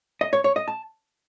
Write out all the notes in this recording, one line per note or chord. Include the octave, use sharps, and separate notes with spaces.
D#5
C#5
C#5
D#5
A5